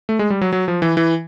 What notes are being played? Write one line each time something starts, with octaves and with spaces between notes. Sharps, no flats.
A3
G#3
G3
F#3
F#3
F3
E3
E3